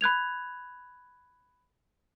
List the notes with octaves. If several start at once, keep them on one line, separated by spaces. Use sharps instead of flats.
B5 F#6 G#6 F7